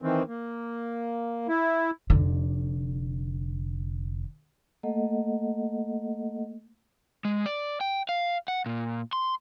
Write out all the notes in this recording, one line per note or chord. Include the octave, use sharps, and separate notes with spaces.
D#3 E3 C4
A#3
E4
F1 D3
A3 A#3 A4 D#5 F#5
G#3
D5
G5
F5
F#5
A#2
C6